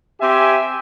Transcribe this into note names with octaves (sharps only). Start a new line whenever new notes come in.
C4 G4 E5 G#5